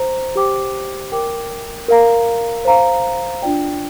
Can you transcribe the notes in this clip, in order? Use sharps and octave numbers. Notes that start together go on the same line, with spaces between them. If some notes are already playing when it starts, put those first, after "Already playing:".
Already playing: C5 A#5
G4 C5 G5 D6
A#4 G5 D6
A#4 F5 A#5
C5 F5 A#5
D4 F4 D5 G5